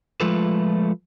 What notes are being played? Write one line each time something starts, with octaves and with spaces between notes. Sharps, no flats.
F3 G#3 A3 F4 A4 B4